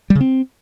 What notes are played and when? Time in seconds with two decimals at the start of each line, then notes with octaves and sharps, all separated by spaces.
0.10 G3
0.15 C#3
0.21 C4